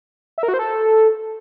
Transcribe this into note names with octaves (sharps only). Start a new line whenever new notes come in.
E5
A#4
F#4
C5
A4